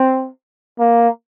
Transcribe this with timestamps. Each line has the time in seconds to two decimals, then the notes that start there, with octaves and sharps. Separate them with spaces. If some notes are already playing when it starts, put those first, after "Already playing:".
Already playing: C4
0.79 A#3